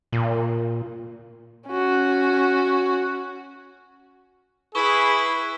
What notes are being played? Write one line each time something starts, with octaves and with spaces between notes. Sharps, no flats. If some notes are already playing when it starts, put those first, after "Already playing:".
A#2
C#4 F#4
E4 G#4 B4 C#6 G7